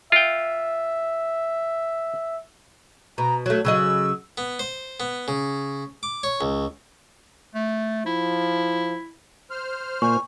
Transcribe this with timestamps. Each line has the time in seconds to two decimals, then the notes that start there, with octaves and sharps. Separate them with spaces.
0.12 F4 E5 G5
3.18 B2 A#5
3.46 F#3 A3 C#5
3.65 C#3 F#3 D#5 E6
4.38 B3
4.59 C5
5.00 B3
5.28 C#3
6.03 D6
6.23 C#5
6.41 C#2
7.55 A3
8.06 F3 E4
9.51 C5 F6
10.02 A#2 G#5 C#6